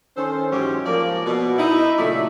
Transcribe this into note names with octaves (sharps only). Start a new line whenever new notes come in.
D#3 C#4 A4 C5
G#2 E3 F#3 C#4 G4
F3 A#3 D5
B2
D#4 E4
A#2 C#3 F#3 A3 E4 D5